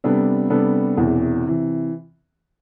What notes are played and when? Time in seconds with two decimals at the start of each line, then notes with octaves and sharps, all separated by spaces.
0.04 C3 G3 B3 D4 A4
0.50 C3 G3 B3 D4 A4
0.97 E1 E2 C3 E3
1.47 C3 E3